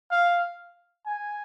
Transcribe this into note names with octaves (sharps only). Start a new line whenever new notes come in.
F5
G#5